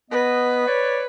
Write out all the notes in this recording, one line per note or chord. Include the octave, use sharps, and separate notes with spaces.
B3 B4 D#5
C#5 D5